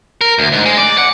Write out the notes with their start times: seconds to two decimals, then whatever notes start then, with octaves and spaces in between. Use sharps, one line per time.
0.21 A#4
0.39 D2
0.52 G#2
0.66 G#3
0.78 D5
0.98 F#5